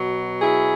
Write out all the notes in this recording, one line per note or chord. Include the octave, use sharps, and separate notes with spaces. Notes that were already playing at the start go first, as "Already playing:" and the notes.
Already playing: B2 F#3
E4 G#4